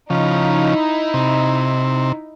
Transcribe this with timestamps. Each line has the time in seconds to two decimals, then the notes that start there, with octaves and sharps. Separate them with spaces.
0.10 C#3 F3 D#4 E4
1.14 C3